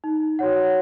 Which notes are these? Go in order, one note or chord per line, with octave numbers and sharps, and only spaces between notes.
D#4
F#4 C#5 F#5